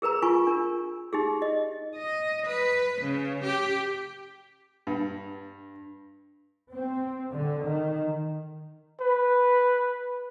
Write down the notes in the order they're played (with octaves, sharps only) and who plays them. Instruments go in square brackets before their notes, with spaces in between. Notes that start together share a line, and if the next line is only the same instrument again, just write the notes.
[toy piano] G#4 A#4 B4 A#5
F4 G#5 C#6
D4 A#4
D#4 G4 G#4
D#5
[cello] D#5
B4
C#3
G4
[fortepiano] G2
[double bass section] C4
D3
D#3
[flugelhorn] B4